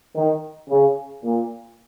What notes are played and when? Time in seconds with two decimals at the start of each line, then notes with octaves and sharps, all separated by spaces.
0.16 D#3
0.70 C#3
1.24 A#2